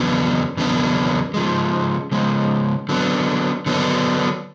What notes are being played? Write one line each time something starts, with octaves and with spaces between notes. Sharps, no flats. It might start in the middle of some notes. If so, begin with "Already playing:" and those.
Already playing: E2 C#3 F#3 B3 D4
E2 C#3 F#3 B3 D4
C#3 F3 G#3
C#3 F3 G#3
D3 F#3 B3 D4
D3 F#3 B3 D4